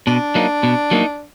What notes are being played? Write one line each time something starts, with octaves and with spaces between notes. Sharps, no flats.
B2 D4
F#3 A#3 D#4
B2
F#3 A#3 D#4